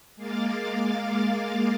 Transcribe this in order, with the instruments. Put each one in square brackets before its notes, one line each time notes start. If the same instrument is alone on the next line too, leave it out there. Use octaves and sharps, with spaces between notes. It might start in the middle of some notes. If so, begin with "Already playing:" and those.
[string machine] G#3 A#3 F5 D6 A6